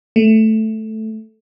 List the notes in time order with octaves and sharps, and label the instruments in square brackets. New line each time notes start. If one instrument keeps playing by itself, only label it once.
[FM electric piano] A3